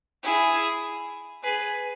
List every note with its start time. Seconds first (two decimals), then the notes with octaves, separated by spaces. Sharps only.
0.23 E4 G#4
1.44 G#4 B4